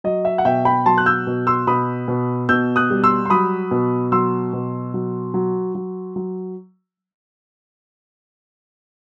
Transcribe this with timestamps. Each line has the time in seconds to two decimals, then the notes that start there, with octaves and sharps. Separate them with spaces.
0.04 F#3 D#5
0.25 E5
0.38 F#5
0.45 B2 E5 G5
0.65 G5 B5
0.86 F#3 A5 C6
0.98 F#6
1.06 E6 G6
1.27 B2
1.47 C6 E6
1.67 B2 B5 D#6
2.08 B2
2.49 B2 E6 G6
2.76 D#6 F#6
2.90 G3
3.03 C6 E6
3.25 C6
3.30 F#3 B5 D#6
3.71 B2
4.12 F#3 C6 E6
4.53 B2
4.94 F#3
5.34 F#3
5.75 F#3
6.16 F#3